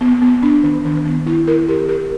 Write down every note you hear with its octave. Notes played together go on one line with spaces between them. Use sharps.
B3
B3
D4
D#3
D#3
B3
E4
A#4
G4
A#4